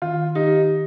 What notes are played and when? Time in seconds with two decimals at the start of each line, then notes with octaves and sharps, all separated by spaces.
0.02 D#3 F4
0.35 D#4 G4